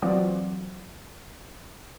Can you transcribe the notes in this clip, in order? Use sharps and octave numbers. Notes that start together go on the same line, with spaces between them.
E3 F#3 C4 F4 F#4 D5